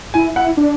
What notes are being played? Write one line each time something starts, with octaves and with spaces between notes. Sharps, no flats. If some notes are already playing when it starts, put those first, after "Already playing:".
E4 G#5
E4 F#5
D4